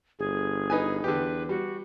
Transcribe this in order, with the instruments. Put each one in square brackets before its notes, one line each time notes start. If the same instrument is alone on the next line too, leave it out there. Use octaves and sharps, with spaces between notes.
[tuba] G1 [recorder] G#4
[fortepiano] D#4 B4 G#5
[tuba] E2 [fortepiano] D3 G4 [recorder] B4
[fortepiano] G3 [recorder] F#4